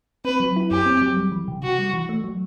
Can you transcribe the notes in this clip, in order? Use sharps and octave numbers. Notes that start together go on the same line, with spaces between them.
C4 B4
F#3
E4
F#2 G4
C4
F#3
G3
E3
C3
C3 F#4
G3
E3
A3
F#3